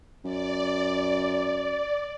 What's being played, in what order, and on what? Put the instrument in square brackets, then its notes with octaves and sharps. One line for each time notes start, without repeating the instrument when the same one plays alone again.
[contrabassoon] F#2 [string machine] D5